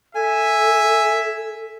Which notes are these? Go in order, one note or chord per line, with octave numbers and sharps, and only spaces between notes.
A4 E5 G#5